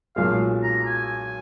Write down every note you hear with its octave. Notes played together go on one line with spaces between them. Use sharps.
B1 A#2 G#3 F5
A#5
G#5